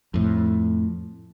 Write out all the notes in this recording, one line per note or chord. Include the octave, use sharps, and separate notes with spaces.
F2 A2